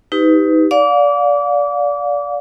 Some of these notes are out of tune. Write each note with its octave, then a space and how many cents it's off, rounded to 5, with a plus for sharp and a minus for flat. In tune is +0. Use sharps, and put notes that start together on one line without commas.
D#4 +25 G4 +0 B4 +25
D5 -20 F5 +30 D6 -30